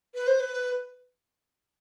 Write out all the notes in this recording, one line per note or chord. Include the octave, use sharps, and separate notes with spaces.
B4
C5
B4